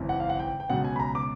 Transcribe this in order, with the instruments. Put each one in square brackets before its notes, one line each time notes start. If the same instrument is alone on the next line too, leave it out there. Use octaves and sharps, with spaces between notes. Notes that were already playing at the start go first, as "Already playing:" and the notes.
Already playing: [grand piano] G#1 F#2 C#3 E3
F#5
F5
F#5
G5
G5
C#2 B2 F#3 F#5
G#5
B5
A#5
D6